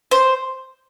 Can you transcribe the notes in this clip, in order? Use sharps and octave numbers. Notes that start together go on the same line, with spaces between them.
C5